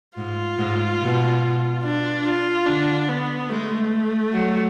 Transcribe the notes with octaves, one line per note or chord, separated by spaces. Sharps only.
G#2 F4
G#2
B2
D4
F4
D3 D4
B3
G#3 A3
F#3